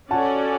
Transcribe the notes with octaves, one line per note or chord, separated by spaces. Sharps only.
C#4 F#4 A4 D5 F#5 A5